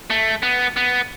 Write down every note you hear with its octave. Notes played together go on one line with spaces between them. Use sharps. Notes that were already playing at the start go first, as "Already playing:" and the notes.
A3
B3
B3